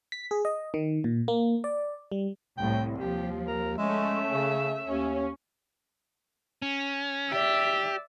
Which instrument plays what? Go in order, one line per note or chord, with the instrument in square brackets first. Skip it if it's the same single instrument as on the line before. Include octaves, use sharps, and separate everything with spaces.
[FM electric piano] B6
G#4
D#5
D#3
A#2
A#3
D5
G3
[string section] C2 A2 [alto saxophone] G5
[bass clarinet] D#2 [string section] F3 [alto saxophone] G4
[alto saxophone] A#4
[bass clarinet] G#3 [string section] A3 C#4 [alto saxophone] E5
[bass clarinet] C#3
[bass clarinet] D#2 [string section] C#4
[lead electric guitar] C#4
[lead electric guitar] G4 [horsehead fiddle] D5 E5